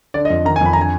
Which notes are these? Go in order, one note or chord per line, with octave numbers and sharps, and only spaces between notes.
D3 D5
D#5
F2
D#3 A#5
G#5
F2 B5
A#5
D3 G#5